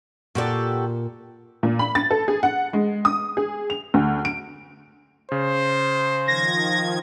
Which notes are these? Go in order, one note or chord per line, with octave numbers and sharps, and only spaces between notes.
A#2 F#4 G4 A4 D5
A#2
B5
A6
A4
G#4
F#5
G#3
D#6
G#4
F7
D2
D7
C#3 C5
D#3 F3 G#6 A#6